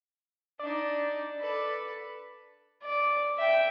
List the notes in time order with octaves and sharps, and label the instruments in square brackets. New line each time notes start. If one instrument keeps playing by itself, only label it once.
[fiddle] D4 D#4 [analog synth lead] D5
[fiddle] A4 B4
[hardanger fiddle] D5
E5 G5